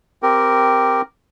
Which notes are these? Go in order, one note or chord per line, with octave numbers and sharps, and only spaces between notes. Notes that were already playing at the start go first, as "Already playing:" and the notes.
C4 G4 A#4